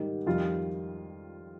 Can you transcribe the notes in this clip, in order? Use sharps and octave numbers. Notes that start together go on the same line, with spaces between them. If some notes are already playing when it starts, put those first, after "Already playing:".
Already playing: G#2 D#3 G3
F2 D#3 G3 F4